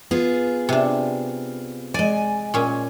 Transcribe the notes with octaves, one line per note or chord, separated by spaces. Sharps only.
B3 F4 G#4
C3 D4
G#3 D5 G#5
A#2 C#4